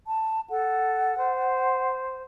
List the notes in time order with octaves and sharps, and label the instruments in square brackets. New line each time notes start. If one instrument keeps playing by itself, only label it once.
[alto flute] A5
[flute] A4 [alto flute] F#5
[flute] C5